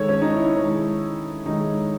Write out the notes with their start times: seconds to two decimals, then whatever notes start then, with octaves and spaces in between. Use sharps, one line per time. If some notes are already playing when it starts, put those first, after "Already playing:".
Already playing: D#3 G#3 A4 C#5
0.09 C#4
0.22 D#4
0.35 E4
0.56 D#3 G#3 C#4
1.46 D#3 G#3 D#4